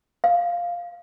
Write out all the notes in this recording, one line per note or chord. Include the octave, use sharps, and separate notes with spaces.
F5